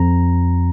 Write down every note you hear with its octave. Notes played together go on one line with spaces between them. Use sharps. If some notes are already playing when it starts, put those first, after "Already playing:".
Already playing: F2 A#5